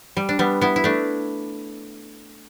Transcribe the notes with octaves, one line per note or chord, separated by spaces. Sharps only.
G3
D4
G3 B3
B3 E4
E4
A3 D4